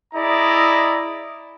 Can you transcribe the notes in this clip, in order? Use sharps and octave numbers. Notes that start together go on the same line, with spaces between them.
E4 G#4 D5 D#5 A#5